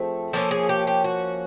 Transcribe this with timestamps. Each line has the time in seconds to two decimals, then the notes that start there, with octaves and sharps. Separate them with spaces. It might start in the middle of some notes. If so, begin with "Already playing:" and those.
Already playing: F3 A3 C4 G#4
0.33 F3 A#3 C#4 A4
0.51 G#4
0.69 G4
0.87 G4
1.04 F#4